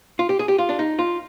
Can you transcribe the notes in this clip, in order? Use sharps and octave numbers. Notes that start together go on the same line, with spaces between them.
F4
G4
G#4
G4
F4
D4
D#4
F4